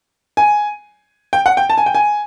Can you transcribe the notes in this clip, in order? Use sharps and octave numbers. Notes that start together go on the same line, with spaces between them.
G#5
G5
F#5
G5
A5
G#5
G5
G#5